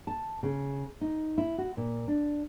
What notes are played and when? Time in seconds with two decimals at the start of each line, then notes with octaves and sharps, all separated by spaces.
0.07 A5
0.43 C#3
1.01 D#4
1.38 E4
1.58 F#4
1.77 A#2
2.08 D4